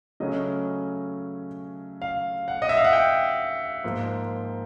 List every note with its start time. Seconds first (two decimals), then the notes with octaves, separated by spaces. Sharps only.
0.20 C#3 F#3 A3 C#4 D#5
2.02 F5
2.48 F#5
2.62 D#5
2.69 E5
2.77 F5
2.84 F#5
2.93 G5
3.84 G#2 F3 A#3